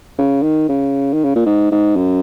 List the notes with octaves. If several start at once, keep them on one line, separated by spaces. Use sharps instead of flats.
C#3
D#3
C#3
D#3
C#3
A#2
G#2
G#2
F#2